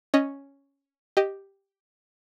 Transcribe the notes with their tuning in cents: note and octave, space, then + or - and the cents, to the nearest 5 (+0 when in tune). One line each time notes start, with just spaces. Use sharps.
C#4 +0 D#5 -5
G4 +0 D#5 +0